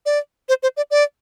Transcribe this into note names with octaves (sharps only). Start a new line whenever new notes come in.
D5
C5
C5
D5
D5